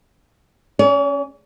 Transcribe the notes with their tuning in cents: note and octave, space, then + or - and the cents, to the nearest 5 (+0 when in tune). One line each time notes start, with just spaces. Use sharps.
C#4 +0 C#5 +45